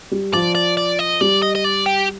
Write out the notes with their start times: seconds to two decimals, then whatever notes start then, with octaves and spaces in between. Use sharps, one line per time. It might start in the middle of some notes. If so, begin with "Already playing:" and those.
0.12 G3
0.33 F3 D5
0.55 D5
0.77 D5
0.99 D#5
1.21 G3 D5
1.42 D#5
1.55 D#5
1.64 D5
1.86 G4